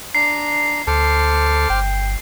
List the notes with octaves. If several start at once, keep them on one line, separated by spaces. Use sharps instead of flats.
D4 A#5 C7
D2 A4 C5 D6 F6
G1 G5